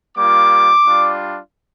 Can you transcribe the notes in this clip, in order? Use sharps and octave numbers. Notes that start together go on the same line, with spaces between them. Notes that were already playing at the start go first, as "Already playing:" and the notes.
G3 A#3 F4 D6
G3 D4 F4